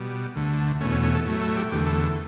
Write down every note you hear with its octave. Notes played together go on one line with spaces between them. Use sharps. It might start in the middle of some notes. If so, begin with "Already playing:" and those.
Already playing: B2 G3
D2 D3 A3
E2 B2 A3 C#4
C#4
C#4
A4
A2 F#3 A3
A4
G4
E2 D3 A3 G4
A4